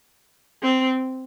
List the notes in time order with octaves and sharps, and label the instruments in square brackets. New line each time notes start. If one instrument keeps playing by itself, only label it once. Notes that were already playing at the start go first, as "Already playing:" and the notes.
[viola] C4